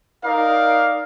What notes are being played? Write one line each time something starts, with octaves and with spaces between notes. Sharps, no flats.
D#4 A#4 D5 F5